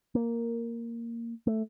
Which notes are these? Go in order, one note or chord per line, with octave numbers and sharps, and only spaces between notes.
A#3
A3